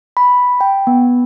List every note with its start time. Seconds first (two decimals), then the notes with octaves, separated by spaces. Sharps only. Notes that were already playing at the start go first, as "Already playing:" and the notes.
0.17 B5
0.61 G5
0.87 B3